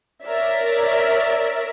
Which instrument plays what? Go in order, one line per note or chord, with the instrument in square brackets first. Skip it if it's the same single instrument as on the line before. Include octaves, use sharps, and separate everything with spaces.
[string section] A#4 C#5 D5 E5